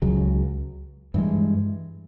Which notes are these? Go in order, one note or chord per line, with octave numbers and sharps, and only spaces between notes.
C#2 C#3 F#3
G2 E3 G#3